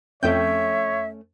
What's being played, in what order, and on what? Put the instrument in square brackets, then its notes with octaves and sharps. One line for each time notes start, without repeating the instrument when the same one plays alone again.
[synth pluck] F2 G5 G6 [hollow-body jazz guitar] A3 C#4 [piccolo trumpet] C#5 [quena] E5